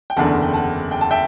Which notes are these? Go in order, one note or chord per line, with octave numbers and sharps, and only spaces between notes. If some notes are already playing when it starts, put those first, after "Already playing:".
G5
F#1 E2 D3 F#5 A5
G5
F#5 A5
G5
A5
E5 G5